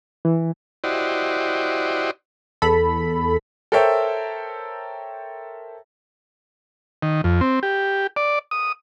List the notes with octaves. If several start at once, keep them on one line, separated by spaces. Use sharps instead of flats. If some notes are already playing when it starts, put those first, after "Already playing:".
E3
E4 F#4 G4 C5 D5 D#5
E2 A4 B5
A4 A#4 C5 C#5 E5 G5
D#3
F2
C4
G4
D5
D#6